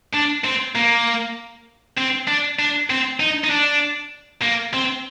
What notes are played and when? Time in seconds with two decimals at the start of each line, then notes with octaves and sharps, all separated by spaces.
0.14 D4
0.44 C4
0.75 A#3
1.98 C4
2.28 D4
2.59 D4
2.90 C4
3.20 D#4
3.44 D#4
3.50 D4
4.42 A#3
4.73 C4